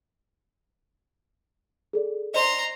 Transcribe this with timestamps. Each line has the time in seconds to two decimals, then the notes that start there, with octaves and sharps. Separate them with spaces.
1.93 G#4 A4 D5
2.34 C5 D5 D#5 A#5 C6